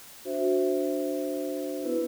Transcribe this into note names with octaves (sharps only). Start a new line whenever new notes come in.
D4 F#4 C5 E5
B3 E4 B4